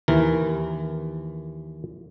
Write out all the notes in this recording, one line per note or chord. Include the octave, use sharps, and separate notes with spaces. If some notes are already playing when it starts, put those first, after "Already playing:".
D#2 E3 A#4